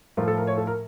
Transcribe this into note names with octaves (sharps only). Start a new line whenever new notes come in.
A2 F3 A3 A#4
A4
A#4
C#5
A4
A#4